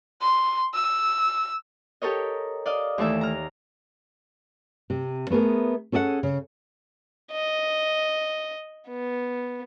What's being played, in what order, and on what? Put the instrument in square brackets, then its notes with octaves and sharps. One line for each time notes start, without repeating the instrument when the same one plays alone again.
[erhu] C6
E6
[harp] G4 A4 A#4 C#5 D#5
D5 D#5 F5
D#2 E3 A3 E5
A#5 F6
[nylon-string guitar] C3
A3 B3 G#4 A#4
C#4 G#4 A4 D5 F#5
C#3
[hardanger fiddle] D#5
B3